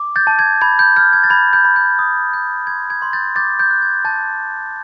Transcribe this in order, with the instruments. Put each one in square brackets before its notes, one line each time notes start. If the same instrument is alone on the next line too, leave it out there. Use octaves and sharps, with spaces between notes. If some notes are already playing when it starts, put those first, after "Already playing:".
Already playing: [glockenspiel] D6
G6 A6
A5
G#6
B5 G#6
G6
F6 G6
G#6
A6
B5 G#6
G6
B5
G6
D#6
G6
C6 G#6
G#6
C6
G6 A6
D6 G6 A6
G6
F#6
G#6
A5 G6 A6